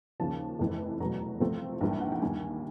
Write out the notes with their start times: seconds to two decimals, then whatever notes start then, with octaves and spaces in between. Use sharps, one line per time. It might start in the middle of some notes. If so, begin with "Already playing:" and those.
0.20 D#2 C#3 F3 A5
0.59 F1 F2 C3 E3
1.00 F1 E2 B2 F#3 A#5
1.40 C2 C3 F3 A3 C4
1.81 A#1 G#2 E3 G3 A#3
1.91 G5
2.01 F#5
2.12 G5
2.22 D#2 D#3 G3 G#5